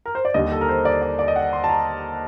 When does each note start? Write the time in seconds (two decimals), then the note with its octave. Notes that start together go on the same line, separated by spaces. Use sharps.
0.06 A#4
0.15 C5
0.25 D5
0.34 D#2 D3 G3 D#5
0.52 A4
0.61 A#4
0.69 C5
0.85 D5
1.02 D5
1.19 D5
1.28 D#5
1.36 F#5
1.53 C6
1.64 A5
1.69 A#5